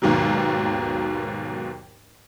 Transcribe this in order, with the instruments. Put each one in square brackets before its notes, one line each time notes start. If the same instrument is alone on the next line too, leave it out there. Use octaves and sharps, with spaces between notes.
[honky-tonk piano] G#1 D#2 G#2 B2 D#3 F#3